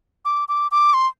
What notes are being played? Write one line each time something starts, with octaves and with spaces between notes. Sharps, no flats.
D6
D6
D6
C6